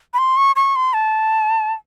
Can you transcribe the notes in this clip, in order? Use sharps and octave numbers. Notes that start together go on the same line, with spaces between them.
B5
C6
C#6
C#6
C6
A5